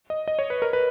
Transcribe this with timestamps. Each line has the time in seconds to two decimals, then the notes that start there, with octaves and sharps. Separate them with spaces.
0.10 D#5
0.28 D#5
0.39 C#5
0.50 B4
0.62 A#4
0.73 B4